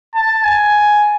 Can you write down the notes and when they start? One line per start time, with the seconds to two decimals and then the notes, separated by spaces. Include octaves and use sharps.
0.15 A5
0.44 G#5